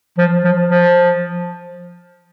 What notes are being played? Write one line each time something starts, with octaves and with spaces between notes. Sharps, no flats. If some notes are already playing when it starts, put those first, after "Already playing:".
F3
F3
F3